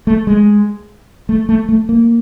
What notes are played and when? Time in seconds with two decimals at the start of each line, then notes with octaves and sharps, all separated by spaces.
0.07 A3
0.27 G#3
1.29 A3
1.49 A3
1.69 A3
1.89 A#3